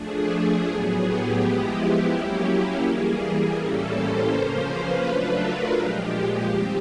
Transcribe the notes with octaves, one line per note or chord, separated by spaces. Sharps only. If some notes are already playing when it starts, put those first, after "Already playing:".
Already playing: F3 A3 D4 G#4
G#4
A2 F#3 B3 G#4
G4
F3 G#3 B3 E4
F#3 A#3 C#4 E4
E3 G3 A#3 G#4
A2 E3 G3 A#3 C#4 A4
C5
C#3 F3 A#3 C#4 F4 C5
B4
F#3 A3 D4 F4 B4
A#4
A#2 F3 G#3 G4
D#3 G3 C4